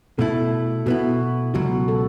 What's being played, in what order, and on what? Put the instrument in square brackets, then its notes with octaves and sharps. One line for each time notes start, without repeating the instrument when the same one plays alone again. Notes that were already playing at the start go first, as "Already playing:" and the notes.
[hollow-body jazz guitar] B2 A3 E4 [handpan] A4
[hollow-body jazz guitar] B2 B3 E4 [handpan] F#4
[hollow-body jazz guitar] C#2 B2 F#3 [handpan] F#4
[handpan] A4